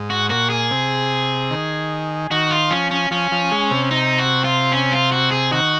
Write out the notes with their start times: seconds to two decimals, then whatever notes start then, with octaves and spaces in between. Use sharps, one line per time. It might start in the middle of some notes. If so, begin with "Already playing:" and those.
Already playing: G#2
0.10 F#4
0.30 A#2 F#4
0.50 G#4
0.71 C3
1.51 D#3
2.31 D#3 F#4
2.51 F4
2.70 F3 C#4
2.91 C#4
3.11 F3 C#4
3.32 F3
3.51 G#3
3.71 C3
3.91 D#4
4.18 F#4
4.44 F4
4.72 C#4
4.92 F4
5.12 F#4
5.31 G#4
5.51 D#3 F#4